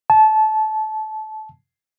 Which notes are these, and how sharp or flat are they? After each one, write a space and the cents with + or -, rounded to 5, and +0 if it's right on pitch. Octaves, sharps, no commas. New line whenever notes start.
A5 -20